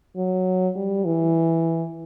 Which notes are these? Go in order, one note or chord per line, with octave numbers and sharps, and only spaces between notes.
F#3
G3
E3